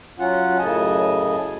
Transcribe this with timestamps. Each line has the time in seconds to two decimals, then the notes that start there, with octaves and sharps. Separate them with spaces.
0.19 F#3 C#4 F4 F#5
0.59 F#2 A2 C#3 D#5 G#5 A5